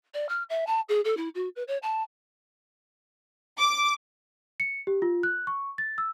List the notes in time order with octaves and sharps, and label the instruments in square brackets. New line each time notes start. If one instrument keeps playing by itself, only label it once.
[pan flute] D5
F6
E5
A5
G#4
A4
E4
F#4
B4
C#5
A5
[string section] D6
[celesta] C#7
G4
F4
F#6
C#6
A6
E6